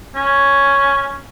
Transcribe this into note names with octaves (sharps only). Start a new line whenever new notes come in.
C#4